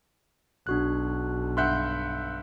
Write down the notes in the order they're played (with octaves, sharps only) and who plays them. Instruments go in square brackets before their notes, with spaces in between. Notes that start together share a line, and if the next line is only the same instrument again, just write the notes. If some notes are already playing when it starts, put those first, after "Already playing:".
[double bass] B1 [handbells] D4 F#4 F#6
[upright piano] G2 E5 F#5 [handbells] C6 F#6 G6